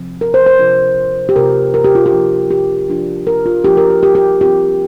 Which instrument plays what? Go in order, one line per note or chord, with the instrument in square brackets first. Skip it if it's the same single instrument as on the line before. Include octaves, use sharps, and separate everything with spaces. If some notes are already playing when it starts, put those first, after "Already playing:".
Already playing: [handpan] C3 F3 C4
A#4
C5
C5
C3 F3 D4 F4
G4
C3 A#3 F4 A#4
A#4
G4
F4
G4
F3 D4 F4
G4
F3 D4 F4
A#4
F4
F3 A#3 D4 F4 G4
A#4
G4
G4
G4
F3 C4 F4 G4